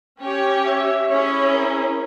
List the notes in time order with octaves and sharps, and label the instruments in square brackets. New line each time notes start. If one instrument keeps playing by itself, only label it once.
[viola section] C#4 G4 C#5 [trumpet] G5
[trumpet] E5
[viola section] C#4 E4 G#4 [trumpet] C#5
[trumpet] A#4